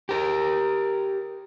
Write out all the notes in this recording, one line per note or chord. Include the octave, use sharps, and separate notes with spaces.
G4 A#4